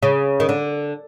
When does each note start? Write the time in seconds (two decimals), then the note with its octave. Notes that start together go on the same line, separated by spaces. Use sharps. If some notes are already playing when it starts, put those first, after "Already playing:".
0.03 C#3
0.40 D#3
0.49 D3